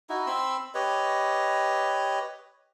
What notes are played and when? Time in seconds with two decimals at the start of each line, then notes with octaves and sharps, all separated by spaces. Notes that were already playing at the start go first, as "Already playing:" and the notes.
0.09 D#4 E4 F#4
0.27 C4 B5 C6 E6
0.74 G4 B4 C#5 D#5